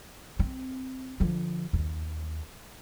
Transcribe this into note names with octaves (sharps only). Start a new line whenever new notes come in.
C4
D3 F3
D#2